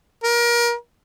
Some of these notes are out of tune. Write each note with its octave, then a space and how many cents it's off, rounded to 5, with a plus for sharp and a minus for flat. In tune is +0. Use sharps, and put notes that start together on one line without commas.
A#4 +30